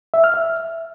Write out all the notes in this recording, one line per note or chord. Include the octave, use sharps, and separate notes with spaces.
E5
F6
E5